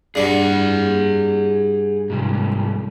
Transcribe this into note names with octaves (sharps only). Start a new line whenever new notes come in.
G2 G3 G#4 F#5
C2 G#2